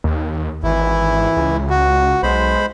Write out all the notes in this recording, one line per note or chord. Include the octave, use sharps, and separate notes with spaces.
D#2
G#1 E3 E4
C#2
F#4
B1 G#3 C5 B5